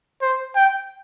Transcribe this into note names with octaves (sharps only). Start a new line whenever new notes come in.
C5
G5